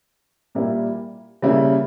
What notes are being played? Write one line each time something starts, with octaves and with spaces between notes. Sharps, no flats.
A#2 G3 A#3 E4
C#3 G3 A#3 E4